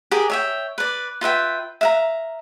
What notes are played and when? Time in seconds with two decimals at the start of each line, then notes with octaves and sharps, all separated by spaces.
0.11 G4 G#4 A#4
0.30 C#5 E5 G5
0.78 B4 D5
1.21 F4 B4 E5 G5
1.81 E5 F5 A#5